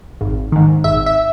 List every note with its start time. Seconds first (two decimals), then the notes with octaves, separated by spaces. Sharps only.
0.21 G#1
0.52 G#2 D#3
0.84 G#1 E5
1.06 E5